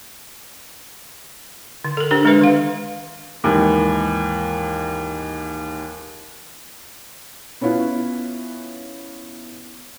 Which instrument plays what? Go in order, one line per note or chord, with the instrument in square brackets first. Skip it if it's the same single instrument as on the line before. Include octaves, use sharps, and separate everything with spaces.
[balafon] D3
A4 A#4
D4 G4 A#4 C5
G#3 D4 A4 B4 E5
D#3 F5
[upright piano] D#2 G#2 E3
[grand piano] B3 C#4 E4 F4 B4